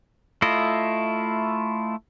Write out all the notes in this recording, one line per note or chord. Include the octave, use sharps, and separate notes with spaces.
A3 E4 F4 D#5